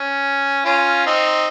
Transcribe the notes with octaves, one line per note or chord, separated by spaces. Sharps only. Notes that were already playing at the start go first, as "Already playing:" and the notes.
Already playing: C#4
C#4 F4
C4 D#4